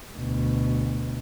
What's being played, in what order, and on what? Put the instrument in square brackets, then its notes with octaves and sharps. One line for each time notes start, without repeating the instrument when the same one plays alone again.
[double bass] D2 B2